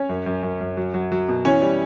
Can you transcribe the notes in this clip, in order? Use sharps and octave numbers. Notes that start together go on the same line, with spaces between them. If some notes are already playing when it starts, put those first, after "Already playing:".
Already playing: C#4 C#5
F#2
F#2
F#2
F#2
F#3
F#3
F#3
B2
E3 C#4 C#5
G3